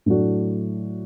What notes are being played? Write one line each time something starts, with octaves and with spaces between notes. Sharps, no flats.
A2 F#3 A3 D4 F#4